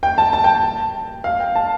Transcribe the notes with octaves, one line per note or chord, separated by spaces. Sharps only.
G5
A5
A5
G5
F5
G5
A5